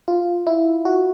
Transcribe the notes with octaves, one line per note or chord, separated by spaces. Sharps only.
F4
E4
F#4